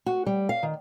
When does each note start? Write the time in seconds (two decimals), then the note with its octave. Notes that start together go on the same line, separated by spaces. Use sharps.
0.06 F#4
0.26 G3
0.49 F5
0.63 D#3